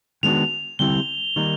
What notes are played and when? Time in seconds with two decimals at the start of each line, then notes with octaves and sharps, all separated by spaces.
0.23 D#3 G#3 B3 D4 F#4 F7
0.79 D3 G3 C4 E4 G4 G7
1.36 D#3 G3 A#3 D#4